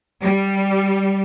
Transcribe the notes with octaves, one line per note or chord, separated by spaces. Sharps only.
G3